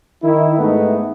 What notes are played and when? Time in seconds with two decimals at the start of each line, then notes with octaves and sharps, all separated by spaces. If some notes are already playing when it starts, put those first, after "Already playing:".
0.23 D#3 E4
0.58 G#2 A3 B3 D#4